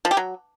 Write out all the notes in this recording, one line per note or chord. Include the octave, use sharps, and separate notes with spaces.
F3
G4
F#3